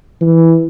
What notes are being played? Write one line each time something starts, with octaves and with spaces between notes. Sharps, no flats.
E3